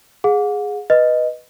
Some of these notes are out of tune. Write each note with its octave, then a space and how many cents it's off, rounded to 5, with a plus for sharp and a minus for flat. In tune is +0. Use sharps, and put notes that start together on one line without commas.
G#4 +0 F#5 -45
B4 +0 D#5 +0